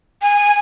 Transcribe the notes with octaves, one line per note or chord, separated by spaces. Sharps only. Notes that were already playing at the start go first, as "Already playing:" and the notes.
G#5